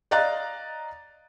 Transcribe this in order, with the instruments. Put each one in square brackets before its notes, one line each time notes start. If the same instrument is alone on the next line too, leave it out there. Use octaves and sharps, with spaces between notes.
[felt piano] D5 D#5 F5 A#5 F#6 A6